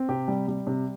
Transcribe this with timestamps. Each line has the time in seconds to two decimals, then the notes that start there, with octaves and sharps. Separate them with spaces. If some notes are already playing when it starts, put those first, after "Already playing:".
Already playing: C4
0.09 C3 G4
0.28 G3
0.48 G3
0.67 C3